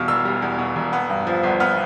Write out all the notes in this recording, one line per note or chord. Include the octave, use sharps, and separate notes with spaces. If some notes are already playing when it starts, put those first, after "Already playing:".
Already playing: E2 B2 G3 F5 F6
E1 E6
G3
E2
B2
E1
B3
G2
F3
G1
B3 F6